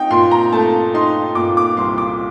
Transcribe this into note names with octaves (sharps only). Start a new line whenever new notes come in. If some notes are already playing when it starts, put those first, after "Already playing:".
Already playing: D#4 G5
A#2 C6
A#5
A3 A5
D#4 C6
A#2 D6
D6
C2 C6
D6